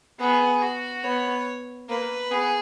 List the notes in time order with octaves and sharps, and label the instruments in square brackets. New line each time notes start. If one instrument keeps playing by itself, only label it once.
[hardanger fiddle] B3 [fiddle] G#4
[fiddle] F#4
[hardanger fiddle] B3 [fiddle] C#5
[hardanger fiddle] A#3 [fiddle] B4
[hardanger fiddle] B3 [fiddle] G#4